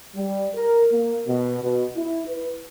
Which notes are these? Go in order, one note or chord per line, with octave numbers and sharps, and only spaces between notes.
G3
A#4
A#3
B2
B2
E4
B4